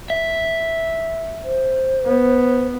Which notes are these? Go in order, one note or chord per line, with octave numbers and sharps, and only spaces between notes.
E5
C5
B3